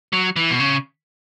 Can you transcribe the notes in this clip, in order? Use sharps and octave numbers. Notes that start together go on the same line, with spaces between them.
F#3
E3
B2
C#3